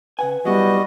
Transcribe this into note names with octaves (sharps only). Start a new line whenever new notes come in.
C#3 B4 F#5 G#5
F#3 G3 B3 E4 F#4 D#5